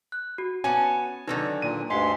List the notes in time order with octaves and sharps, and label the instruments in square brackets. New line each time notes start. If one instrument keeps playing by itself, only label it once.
[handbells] F#6
F#4
[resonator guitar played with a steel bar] B3 C#4 [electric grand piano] G#5 A5
[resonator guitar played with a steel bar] D3 D#3 F#3 [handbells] D#4 B4
[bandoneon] A#2 [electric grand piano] D#7
[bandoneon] D2 G2 C6 [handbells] D#5 G#5 B6